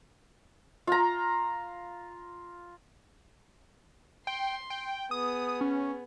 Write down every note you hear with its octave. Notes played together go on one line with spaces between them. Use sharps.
F4 A#5
G5 C6
G5
B3 G#4 D#6
C#4